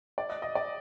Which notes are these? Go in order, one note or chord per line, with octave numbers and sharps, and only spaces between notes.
D5
D#5
D#5
D5